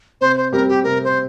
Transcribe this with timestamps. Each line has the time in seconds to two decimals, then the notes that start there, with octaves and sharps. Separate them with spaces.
0.21 C3 C5
0.37 C5
0.52 G3 C4 G4 A#4
0.69 G4
0.84 C3 A#4
1.04 C5